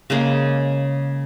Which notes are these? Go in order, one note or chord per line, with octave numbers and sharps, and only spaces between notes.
C#3 G#3 A#3